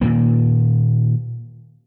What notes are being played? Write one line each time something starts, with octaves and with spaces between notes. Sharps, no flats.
A#2 D#3 A#3